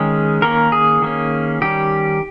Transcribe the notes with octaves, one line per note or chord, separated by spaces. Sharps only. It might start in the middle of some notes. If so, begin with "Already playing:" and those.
Already playing: D#3 G#3 C#4 G#4
D#3 A#3 C#4 A#4
G#4
D#3 A#3 C#4
D#3 G3 C#4 G4